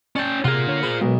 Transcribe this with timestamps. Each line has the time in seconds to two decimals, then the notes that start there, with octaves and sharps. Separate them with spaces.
0.16 C#4 D5 G5 A5
0.44 C3 F4 G#4 A#4 F#5
0.67 D3 C#5
0.83 G#4 C5 B5
1.01 B1 G#3 A#4 B4